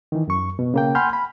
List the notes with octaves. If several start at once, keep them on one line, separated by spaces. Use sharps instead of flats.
D#3 E3
F#2 C#6
B2
C#3 A#3 G5
F#5 G#5 B5 C6 F6 G6
B5